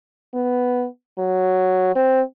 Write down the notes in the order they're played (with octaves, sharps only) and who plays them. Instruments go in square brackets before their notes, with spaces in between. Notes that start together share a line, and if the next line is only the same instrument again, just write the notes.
[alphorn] B3
F#3
C4